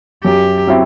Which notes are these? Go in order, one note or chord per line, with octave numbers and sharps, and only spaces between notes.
F#2 G4
F#3 C4 E4